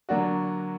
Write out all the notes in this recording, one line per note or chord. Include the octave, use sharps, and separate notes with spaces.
D3 F#3 A#3 D4 F#4